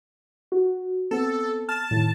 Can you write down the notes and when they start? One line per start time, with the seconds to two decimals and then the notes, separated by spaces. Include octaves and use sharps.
0.52 F#4
1.11 B3 C4 A4
1.69 A5 F6
1.91 A2 D#3